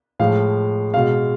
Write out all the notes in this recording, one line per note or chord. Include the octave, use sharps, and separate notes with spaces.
A2 F3 G#3 F5
B2 G#3 F5